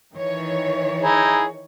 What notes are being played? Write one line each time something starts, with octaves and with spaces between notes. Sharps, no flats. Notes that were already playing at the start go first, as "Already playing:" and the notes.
D#3 E3 C#5
D#4 E4 G#4